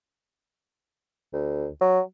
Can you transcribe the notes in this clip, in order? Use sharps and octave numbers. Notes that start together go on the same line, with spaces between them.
D2
F#3